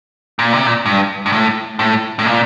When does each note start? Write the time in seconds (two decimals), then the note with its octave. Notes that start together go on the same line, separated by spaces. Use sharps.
0.39 A#2
0.53 C3
0.67 A#2
0.86 G2
1.26 G2
1.32 A2
1.79 A2
2.19 A2
2.26 A#2